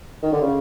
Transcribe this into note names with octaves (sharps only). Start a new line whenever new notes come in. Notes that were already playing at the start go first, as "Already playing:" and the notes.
D#3
D3
C#3